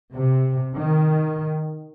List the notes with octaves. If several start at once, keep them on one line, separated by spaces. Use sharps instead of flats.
C3
D#3